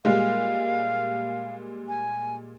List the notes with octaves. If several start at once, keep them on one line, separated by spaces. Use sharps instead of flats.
A#2 G3 G#3 F5
G#5